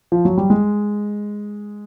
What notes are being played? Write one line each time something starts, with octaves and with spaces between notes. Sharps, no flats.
F3
F#3
G3
G#3